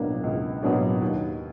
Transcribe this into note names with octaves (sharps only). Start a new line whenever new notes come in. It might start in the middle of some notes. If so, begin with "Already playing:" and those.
Already playing: C#2 B2 F#3 A#3 D4
C#2
B2 F#3 A#3 D4
D#2